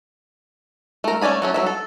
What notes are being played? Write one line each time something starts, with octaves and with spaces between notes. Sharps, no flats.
A3 A#4
A3 C#4 D5 G#5 B5
F#3 A3 C#4
F#3 C#4 E5
A4